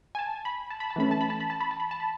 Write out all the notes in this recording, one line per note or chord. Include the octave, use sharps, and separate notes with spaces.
G#5
A5
B5
A5
B5
A5
E3 A3 C#4 B5
A5
B5
A5
B5
A5
B5
A5
B5
A5
B5